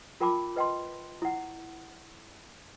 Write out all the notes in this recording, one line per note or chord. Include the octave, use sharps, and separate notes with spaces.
F4 A#4 G5 A5 B5 D6
B4 D#5 G5 A5 C6
E4 F#5